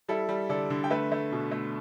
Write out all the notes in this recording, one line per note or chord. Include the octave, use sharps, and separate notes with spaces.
G3 E4 A4
G3
D3 A4 D5
D3
G5
A3 B4 E5
A3
B2
A3